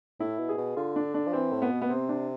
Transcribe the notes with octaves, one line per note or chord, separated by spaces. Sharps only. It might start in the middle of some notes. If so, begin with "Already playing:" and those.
A2 E4
B2
G#4
B2
D3 F4
D4
D4
F3
E3 C4
A2
B3
B2
B3
C3 C4
D4